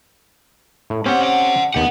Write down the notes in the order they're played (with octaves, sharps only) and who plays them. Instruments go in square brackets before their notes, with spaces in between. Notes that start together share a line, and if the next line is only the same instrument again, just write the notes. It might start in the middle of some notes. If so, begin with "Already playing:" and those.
[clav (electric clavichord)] A2
[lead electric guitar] A#3 F#5 [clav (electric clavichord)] C4 C#4 G4
[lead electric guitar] D5 F#5
[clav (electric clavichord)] D#2 G4 [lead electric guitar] B4 F#5